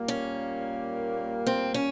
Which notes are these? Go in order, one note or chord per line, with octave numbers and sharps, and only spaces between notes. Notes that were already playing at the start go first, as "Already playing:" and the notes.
Already playing: A#2 G3 A#3
C#4
C4
C#4